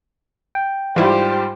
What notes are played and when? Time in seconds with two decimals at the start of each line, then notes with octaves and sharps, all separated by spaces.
0.55 G5
0.96 G#2 E3 G3 E4 F4 G4 C5